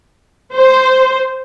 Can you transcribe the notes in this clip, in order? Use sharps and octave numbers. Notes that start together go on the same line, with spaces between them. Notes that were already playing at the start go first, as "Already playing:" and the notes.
C5